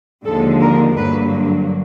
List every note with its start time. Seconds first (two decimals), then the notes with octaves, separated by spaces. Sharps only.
0.24 D#2 D3 F3 G#3 A4
0.61 A#4
0.97 G2 D3 F#3 A#3 B4